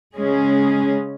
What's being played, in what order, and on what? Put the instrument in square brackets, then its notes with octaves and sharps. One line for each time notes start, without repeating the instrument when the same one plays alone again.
[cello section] C#3 G#3 C#4 G#4